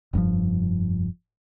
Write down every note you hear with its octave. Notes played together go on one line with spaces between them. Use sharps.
F1 G2 A#2 F3